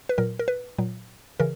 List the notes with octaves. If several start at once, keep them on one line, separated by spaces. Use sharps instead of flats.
B4
A#2 F#3 A#4
A#4
B4
A#2 F#3
C#3 E3 A#4